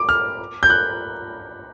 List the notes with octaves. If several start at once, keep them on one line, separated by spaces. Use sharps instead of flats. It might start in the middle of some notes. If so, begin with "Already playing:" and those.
Already playing: D6
F6
G6
F#6